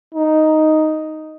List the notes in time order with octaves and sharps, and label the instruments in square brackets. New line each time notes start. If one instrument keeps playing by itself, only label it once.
[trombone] D#4